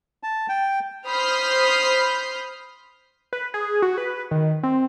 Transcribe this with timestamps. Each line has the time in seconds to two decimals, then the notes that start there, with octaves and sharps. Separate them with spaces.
0.23 A5
0.49 G5
1.07 C5 B5 D#6 F6 G6 C7
3.33 B4
3.54 G#4
3.82 F#4
3.98 B4
4.31 D#3
4.63 C4